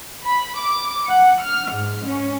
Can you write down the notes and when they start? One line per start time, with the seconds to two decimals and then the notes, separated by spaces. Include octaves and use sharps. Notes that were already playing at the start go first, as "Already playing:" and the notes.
0.25 B5
0.58 D6
1.07 F#5
1.41 F6
1.71 G#2
2.03 C#4